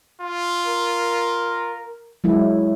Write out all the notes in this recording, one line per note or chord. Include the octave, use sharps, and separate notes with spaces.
F4
A#4
F#3 G#3 E4